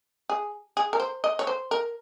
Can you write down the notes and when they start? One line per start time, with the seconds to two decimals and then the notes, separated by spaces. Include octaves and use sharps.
0.30 G#4
0.77 G#4
0.93 A#4
1.00 C5
1.24 D#5
1.39 C#5
1.47 C5
1.71 A#4